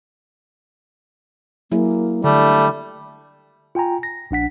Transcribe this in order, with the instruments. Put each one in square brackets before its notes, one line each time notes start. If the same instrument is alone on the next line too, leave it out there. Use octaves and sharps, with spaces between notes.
[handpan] F#3 E4 G#4 [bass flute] A#3
[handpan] D3 [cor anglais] G3 [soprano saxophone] A3 [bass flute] D5
[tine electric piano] F4 G5 G#5 A#5
A#6
A#1 D4 F#5 B6